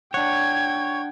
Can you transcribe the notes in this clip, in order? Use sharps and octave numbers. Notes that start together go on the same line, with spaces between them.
D4 C#5 F#5 G5 G#6